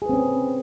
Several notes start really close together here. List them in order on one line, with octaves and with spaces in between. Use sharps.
G#4 B4 C4 C#4